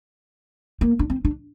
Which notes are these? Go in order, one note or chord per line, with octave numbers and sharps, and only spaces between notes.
A#3
D4
C4
D4